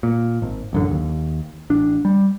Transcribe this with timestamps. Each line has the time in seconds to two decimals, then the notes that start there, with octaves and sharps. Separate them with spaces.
0.03 A#2
0.42 G#1
0.73 A1 F#2 D3
0.91 D#2
1.70 A1 D4
2.05 G3